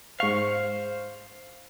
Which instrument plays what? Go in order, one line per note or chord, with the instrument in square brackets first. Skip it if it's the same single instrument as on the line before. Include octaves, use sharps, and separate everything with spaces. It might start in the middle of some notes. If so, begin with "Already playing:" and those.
[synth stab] G#2 C#6 [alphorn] C5 [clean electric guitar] F5